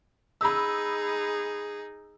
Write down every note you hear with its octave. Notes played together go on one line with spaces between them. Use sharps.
D#4 G#4 B5 E6